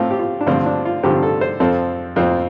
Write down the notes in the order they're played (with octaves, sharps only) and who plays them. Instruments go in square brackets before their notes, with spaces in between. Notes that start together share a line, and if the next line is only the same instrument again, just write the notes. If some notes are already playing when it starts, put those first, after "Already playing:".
Already playing: [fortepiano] A2 A3 C4 F4
G4
F4
D4
G2 D3 F3 C4 F4
D4
F4
G2 D3 F3 C4 G4
A4
C5
F2 F3 C4 A4
F2 F3 C4